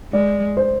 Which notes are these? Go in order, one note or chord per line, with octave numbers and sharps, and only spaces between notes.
G#3 D5
C5